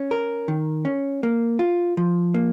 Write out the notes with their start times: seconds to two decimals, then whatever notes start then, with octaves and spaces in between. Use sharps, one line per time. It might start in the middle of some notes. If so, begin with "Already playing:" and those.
Already playing: C#4
0.11 A#4
0.48 D#3
0.85 C#4
1.23 A#3
1.59 F4
1.97 F3
2.34 A#3